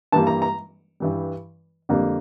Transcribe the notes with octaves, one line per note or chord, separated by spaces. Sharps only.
G2 E3 G3 A#3 A5
A#5
A#5
G2 E3 G3
F2 D3 G3 A#3